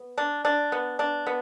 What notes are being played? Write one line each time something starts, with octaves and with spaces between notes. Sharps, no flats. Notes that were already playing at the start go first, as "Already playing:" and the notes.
Already playing: B3
D4
D4
B3
D4
B3